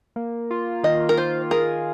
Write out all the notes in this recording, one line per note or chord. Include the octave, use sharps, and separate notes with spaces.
A#3
F4
D#3 D#5
A#4
F4 C5
G#4 A#4